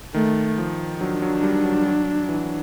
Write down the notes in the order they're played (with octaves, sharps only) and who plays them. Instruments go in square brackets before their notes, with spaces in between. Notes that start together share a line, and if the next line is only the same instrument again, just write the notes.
[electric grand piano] D#3 [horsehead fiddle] A3
[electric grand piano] F3
[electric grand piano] F#3 [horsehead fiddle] D4
[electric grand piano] F#3
G3
F#3
F#3
E3